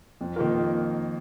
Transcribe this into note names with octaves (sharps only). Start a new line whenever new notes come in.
F2
D#3 A#3 F4 A#4